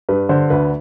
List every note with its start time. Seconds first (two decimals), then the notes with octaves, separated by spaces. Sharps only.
0.09 G2 B4
0.29 D3 C5
0.50 D2 B4